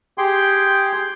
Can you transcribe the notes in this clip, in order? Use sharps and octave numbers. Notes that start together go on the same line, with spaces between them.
G4 G#4 G5 C6